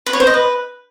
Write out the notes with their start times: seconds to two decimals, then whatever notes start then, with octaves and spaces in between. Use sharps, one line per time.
0.06 B4
0.13 C#5
0.20 C5
0.27 D#5
0.34 B4